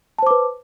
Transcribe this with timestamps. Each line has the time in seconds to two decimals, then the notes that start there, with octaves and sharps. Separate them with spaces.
0.18 A5
0.23 C5
0.27 D6
0.31 B4